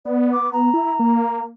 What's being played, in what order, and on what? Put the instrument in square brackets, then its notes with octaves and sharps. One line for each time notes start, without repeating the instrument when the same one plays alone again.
[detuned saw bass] B3 [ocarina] D5
[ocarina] D6
A#5
[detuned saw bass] E4
A#3